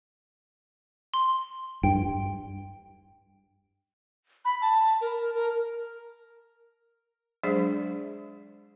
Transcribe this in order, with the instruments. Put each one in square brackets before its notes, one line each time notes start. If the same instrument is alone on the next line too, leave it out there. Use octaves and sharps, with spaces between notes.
[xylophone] C6
[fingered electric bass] G2 [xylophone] G5
[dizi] B5
A5
A#4
A#4
[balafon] F#3 G#3 D4 G#4 C5 D5